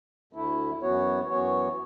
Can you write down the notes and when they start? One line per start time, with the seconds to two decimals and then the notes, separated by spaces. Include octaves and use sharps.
0.33 D2 D3 A3 E4
0.81 F#2 E3 B3 F#4 C#5
1.29 F#2 E3 B3 F#4 C#5